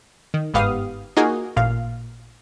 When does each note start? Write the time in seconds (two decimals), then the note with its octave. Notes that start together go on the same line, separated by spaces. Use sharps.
0.34 D#3
0.54 G1 G#2 B3 G4 F5 D#6
1.17 A#3 D#4 F4 F#4 G#4
1.56 A1 A#2 F5